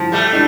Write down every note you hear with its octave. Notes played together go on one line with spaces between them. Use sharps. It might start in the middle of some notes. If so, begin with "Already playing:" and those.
Already playing: F3
G3 A3
D4